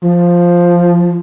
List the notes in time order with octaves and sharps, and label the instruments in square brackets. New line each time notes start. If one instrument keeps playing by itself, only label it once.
[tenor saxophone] F3